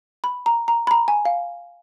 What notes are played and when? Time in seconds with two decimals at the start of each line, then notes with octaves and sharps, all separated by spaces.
0.24 B5
0.46 A#5
0.68 A#5
0.87 B5
0.91 A#5
1.08 G#5
1.25 F5